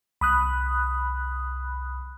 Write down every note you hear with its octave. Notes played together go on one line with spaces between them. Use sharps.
C2 B5 D#6 F#6